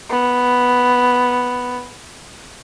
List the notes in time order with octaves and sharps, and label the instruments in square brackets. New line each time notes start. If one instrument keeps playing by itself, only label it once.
[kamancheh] B3